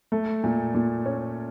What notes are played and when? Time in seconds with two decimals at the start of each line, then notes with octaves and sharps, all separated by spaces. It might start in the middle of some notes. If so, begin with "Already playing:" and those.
0.12 A3
0.44 A#2
0.74 A#2
1.06 C#4